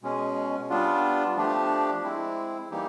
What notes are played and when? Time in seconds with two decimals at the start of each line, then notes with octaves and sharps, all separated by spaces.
0.02 B2 G#3 C#4
0.69 G3 B3 D4 F4
1.37 F3 A3 D4 G4
2.04 G#3 C4 E4
2.71 E3 G3 A#3 D#4 G4